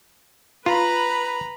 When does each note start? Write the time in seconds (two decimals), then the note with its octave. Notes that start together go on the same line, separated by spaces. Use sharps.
0.66 F4 B4 A#5 B5